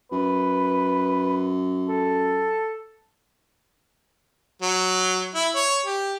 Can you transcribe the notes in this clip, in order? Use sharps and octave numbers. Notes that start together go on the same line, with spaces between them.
F#2 B4
A4
F#3
E4
C#5
G4